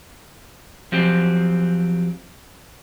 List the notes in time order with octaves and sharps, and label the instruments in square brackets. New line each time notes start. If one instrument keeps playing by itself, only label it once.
[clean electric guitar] F3 F#3 C4 G4